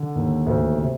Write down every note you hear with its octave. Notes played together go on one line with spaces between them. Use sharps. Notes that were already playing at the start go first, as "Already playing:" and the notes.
Already playing: D3
D#2
D2
C3